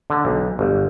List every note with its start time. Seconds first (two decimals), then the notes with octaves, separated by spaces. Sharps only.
0.10 D3
0.25 B1
0.59 G1